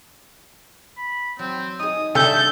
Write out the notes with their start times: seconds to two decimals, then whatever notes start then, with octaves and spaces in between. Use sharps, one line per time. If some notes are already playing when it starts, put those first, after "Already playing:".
0.97 B5
1.39 F#3 C4
1.79 D#4 G#4 D#6
2.15 D3 G3 A4 E5 G6